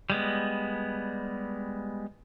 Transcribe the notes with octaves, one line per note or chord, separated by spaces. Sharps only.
G3 G#3 B3